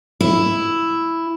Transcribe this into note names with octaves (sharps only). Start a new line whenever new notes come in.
E4